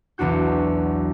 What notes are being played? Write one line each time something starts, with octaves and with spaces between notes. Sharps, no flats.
B1 E2 D4 F#4 G6